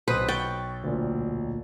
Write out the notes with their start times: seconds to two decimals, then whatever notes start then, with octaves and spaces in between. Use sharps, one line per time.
0.08 B1 B4 C5 D#6
0.28 G5 C#6 A6
0.83 D2 A#2